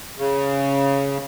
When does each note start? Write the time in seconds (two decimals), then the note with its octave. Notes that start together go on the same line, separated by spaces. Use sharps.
0.18 C#3